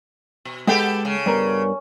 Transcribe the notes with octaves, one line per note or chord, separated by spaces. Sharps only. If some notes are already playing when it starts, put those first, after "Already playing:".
B2
G#3 B3 G4 A4 F#5 G5
C#3
G2 B3 A#4